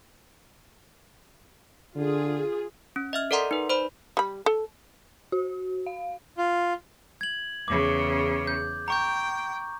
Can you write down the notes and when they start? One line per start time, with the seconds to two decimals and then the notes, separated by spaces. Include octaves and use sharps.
1.96 D3 F4 G#4
2.96 C#4
3.13 D#5 E5 F6
3.31 A4 A#4 D5 F#5 A#5 C6
3.51 D#4 B4
3.70 C5 D5 B5
4.17 G3 B5
4.46 A4
5.32 F#4
5.86 F5
6.38 F4
7.21 G#6 F#7
7.68 E2 C#3 D6
8.47 G6
8.88 G5 A#5 C#6 G6